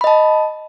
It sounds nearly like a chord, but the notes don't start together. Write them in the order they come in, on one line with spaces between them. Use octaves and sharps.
B5 D#5 A5